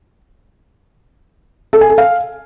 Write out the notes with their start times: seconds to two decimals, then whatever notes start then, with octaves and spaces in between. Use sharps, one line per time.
1.73 A4
1.81 G#5
1.90 A4
1.98 F5